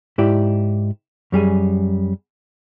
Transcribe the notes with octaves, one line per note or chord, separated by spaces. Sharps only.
G#2 E4 G4 D5
F#2 G3 G#4 G#5